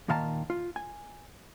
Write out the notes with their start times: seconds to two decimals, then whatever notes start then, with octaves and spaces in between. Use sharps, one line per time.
0.08 D#2 A#2 D#3 F5 A5 A#5
0.50 F4
0.76 G#5